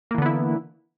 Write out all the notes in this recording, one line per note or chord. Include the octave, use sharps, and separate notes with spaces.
D3 E3 A#3 B3 E4